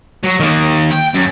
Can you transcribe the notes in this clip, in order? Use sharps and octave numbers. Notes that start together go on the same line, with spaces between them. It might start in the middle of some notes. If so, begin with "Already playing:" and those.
F#3
D#3 A#3
G5
F#2